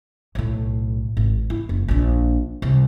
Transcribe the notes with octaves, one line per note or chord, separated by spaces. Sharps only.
B1 A2
G#1
E4
F#1
A#1 D4
C2